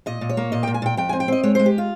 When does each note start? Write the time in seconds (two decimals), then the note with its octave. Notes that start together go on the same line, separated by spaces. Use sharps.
0.06 A#2 D#5
0.21 A#2
0.29 C#5
0.37 A#3
0.52 A#2 D#5
0.63 A#2 G5
0.74 G#5
0.82 A#2 G5
0.97 F2 G5
1.09 C4 G#5
1.20 G5
1.28 C4 D#5
1.43 G#3 C#5
1.55 G#3 C5
1.66 G4
1.78 F4